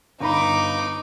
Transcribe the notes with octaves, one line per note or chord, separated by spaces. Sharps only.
G1 D#4 A#5 B5 D6